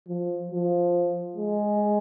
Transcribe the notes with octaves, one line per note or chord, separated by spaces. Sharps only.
F3
F3
G#3